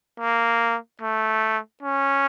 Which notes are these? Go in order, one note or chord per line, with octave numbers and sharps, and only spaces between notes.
A#3
A3
C#4